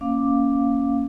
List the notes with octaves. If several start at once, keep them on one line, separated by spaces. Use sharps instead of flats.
A#3 C#4 F5 D6